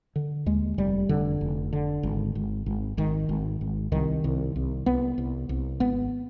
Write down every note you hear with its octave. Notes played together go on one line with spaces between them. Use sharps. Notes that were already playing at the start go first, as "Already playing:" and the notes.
D3
D#2 G#3
F1 G3
F1 D3
F1
D3
G#1
G#1
G#1
G#1 D#3
G#1
G#1
C2 D#3
C2
C2
C2 B3
C2
C2
G#1 B3